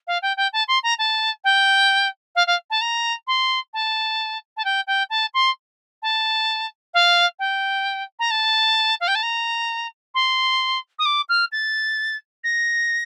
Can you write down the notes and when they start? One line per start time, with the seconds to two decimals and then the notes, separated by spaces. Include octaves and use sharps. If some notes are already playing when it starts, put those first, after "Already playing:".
0.07 F5
0.22 G5
0.37 G5
0.53 A5
0.68 C6
0.83 A#5
0.98 A5
1.44 G5
2.35 F5
2.47 F5
2.70 A5
2.81 A#5
3.27 C6
3.73 A5
4.57 A5
4.65 G5
4.87 G5
5.10 A5
5.34 C6
6.02 A5
6.94 F5
7.39 G5
8.19 A#5
8.31 A5
9.00 F5
9.08 G5
9.15 A5
9.23 A#5
10.14 C6
10.99 D#6
11.05 D6
11.29 F6
11.52 A6
12.44 A#6